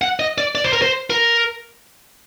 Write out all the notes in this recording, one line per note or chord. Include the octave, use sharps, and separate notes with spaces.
F#5
D#5
D5
D5
C5
A#4
C5
A#4